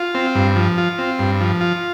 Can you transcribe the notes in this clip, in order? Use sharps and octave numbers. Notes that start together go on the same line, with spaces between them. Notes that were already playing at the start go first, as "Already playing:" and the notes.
Already playing: F4
C4
G2
F3
F4
C4
G2
F3
F4